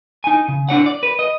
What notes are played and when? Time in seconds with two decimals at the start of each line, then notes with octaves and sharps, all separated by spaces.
0.24 D#4 G#5
0.48 C#3
0.69 D4 C#5 F#5
0.86 D5
1.03 B4
1.19 D#5